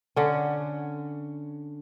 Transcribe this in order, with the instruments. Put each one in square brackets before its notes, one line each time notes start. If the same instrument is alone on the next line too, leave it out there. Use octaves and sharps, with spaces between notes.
[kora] D3 C#4